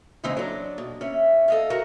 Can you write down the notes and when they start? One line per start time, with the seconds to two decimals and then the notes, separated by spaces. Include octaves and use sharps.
0.24 C#3 E3 G#3 C4 D#4
0.37 F#3 D4
0.78 B2
1.01 C#4 E5
1.48 A4 D#5 F5
1.70 F#4 A#4